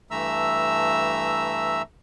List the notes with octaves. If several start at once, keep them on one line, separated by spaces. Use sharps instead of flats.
G2 E3 A3 E5 A#5 E6